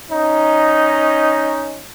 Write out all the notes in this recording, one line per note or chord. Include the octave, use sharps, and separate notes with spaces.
C#4 D#4